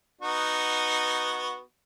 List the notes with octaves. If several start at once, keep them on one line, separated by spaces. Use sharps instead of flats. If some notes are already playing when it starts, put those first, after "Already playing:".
B3 D#4 F#4